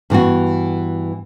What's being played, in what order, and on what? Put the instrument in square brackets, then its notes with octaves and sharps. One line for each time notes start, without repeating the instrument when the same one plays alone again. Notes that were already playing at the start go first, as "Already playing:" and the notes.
[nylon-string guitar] G2 E3 B3 F#4